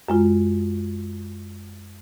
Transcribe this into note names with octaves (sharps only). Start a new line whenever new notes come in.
F#2 G#3 F4